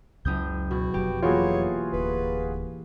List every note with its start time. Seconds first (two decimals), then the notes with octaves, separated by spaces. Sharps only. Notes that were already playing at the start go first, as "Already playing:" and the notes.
0.25 F#1 C#2 C#4 D#6 G6
0.71 B2 F#4
0.94 F1 F#3 G4
1.22 E3 A#3 F4 F#4 G#4 C#5
1.93 D1 B4